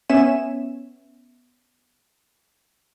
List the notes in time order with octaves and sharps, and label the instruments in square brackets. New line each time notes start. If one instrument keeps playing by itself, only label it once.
[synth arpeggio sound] B3 C#4 C#5 E5 G#5 E7